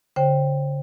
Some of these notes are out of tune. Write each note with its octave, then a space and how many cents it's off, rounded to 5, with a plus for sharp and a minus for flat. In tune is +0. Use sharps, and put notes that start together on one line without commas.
D3 -45 C5 +20 G5 +0